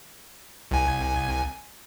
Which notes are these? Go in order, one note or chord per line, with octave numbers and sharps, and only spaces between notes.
C2 G#5